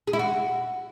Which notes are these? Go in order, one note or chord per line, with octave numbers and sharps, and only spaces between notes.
G#4
E4
F#4